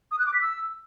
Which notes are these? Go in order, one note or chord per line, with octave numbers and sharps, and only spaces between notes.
D#6
F#6
D6
B6
E6